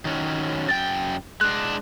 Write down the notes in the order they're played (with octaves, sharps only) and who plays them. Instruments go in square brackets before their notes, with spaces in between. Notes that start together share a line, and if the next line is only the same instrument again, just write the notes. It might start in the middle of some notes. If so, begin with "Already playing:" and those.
[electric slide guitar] D#3 F#3 C#4
[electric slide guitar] F#2 G5 [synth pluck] A6
[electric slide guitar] G#3 D4 [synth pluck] F#6